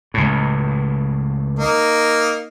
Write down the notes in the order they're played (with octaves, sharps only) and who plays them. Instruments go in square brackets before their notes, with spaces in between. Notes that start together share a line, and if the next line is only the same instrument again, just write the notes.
[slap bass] C#2 A2
[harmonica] A#3 D#4